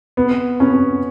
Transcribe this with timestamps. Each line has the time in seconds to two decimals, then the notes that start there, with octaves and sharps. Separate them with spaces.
0.17 B3
0.60 B3 C#4